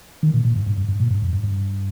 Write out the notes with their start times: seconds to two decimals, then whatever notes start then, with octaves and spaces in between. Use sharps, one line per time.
0.23 D#3
0.34 A#2
0.45 A#2
0.56 G2
0.66 G2
0.77 G2
0.89 G2
1.00 A#2
1.11 G2
1.22 F2
1.33 G2
1.43 G2